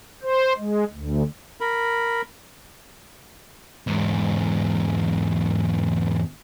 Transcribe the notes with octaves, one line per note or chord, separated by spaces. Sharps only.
C5
G#3
D2
A#4 B5
E2 G#2